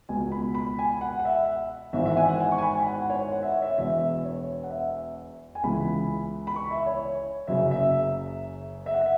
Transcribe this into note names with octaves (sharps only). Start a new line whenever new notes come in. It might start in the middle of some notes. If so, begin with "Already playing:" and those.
C#2 B2 G#5
B5
B5
G#5
F#5
F#5
E5
G#1 G#2 E3 E5
E5
F#5
G#5
F#5
G#5
C#6
G#5
B5
G#5
F#5
C#5
F#5
E5
C#5
E5
E1 E2 B2 E5
C#5
F#5
E5
G#5
C#2 C#3 E3 B5
B5
C#6
E5
C#5
F#1 F#2 C#3 E5
E5
E5
F#5
E5